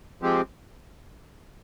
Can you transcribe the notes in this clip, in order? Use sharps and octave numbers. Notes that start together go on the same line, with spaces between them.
F3 G#3 C4 G4